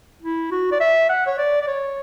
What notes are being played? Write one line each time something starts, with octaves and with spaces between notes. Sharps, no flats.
E4
F#4
D5
E5
F#5
C#5
D5
D5
C#5